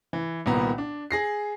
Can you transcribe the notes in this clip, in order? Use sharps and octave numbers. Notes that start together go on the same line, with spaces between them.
E3
C2 A#2 D#3 B3 A#5
D4
G#4 A#6 C7